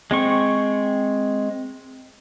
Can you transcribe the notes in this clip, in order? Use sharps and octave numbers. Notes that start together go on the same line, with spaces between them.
G#3 C4 C#6